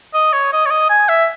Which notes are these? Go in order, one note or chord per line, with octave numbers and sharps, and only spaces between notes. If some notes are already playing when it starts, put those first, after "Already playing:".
D#5
C#5
D#5
C#5
D#5
G#5
E5